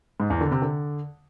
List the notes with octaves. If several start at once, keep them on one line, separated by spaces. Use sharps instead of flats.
G#2
E2
D3
C3
D3